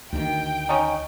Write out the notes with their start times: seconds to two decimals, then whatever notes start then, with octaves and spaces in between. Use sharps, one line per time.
0.12 D2 D#3 G5
0.69 C#4 D#4